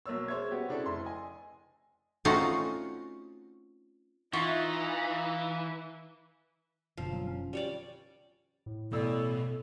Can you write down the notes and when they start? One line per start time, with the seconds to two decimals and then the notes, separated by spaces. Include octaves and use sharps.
0.06 B1 A#3 C#5 E6
0.28 G#3 C5 C#5 E5 G#6
0.51 B3 F#4 G4
0.69 C#3 C4 D4 E4 A4
0.86 F1 E4 C6
1.05 D#5 G#5
2.25 A3 C4 C#4 D#4 F4 F#4
4.33 E3 D#4 F4 D#5 C#6
6.98 F#1 B2 D3 F3
7.13 F#3
7.27 C#4
7.53 G3 C#5 D5
8.66 A2
8.93 A1 B2 A4 D5 E6